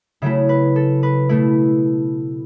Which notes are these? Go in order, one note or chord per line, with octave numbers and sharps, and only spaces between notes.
C#3 F#3 A3 E4 E5
B4
A4
B4
B2 A3 E4